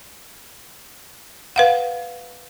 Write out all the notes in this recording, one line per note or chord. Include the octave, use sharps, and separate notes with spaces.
B4 F5 F#5